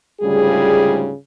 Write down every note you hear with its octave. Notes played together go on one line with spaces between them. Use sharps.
D2 G#2 C#3 G3 F4 G#4